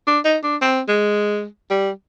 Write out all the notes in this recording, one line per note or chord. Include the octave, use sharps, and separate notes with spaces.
D4
D#4
D4
C4
G#3
G3